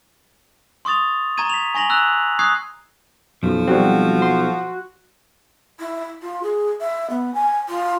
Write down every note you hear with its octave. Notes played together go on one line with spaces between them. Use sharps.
C6 C#6 D#6 A6 F7
A#5 C#6 G#6 D#7
B6 F7
G#5 C#6 A#6 F7 F#7
A#5 E6 F#6 F7
C#6 D#6 F#6 G#6 C7
B1 F#2 F3
G3 C4 F#4
C6
E4
F4
G#4
E5
B3
G#5
F4